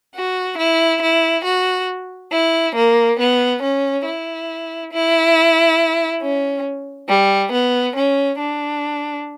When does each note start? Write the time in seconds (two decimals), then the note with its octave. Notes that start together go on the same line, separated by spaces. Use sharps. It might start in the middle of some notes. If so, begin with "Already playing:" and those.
0.14 F#4
0.58 E4
1.00 E4
1.44 F#4
2.31 E4
2.74 A#3
3.18 B3
3.61 C#4
4.04 E4
4.91 E4
6.21 C#4
7.07 G3
7.51 B3
7.95 C#4
8.38 D4